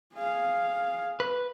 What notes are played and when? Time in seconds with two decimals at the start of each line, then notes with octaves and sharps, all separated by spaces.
0.14 G#4 F5
1.20 B4